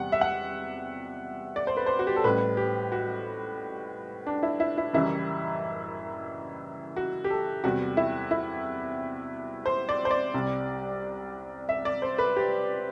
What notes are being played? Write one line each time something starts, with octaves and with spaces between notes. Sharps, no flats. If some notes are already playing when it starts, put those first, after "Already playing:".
Already playing: E2 C3 G3 F#5
E5
F#5
D5
C5
B4
C5
F#4
G4
A4
A1 A2 G3 B4
G4
F#4
D4
E4
E4
E4
F#1 F#2 E3 G3 E4
F#4
G4
A4
E2 C3 G3 F#4
E4
E4
C5
D5
C5
D5
C2 C3 G3
E5
D5
C5
B4
G4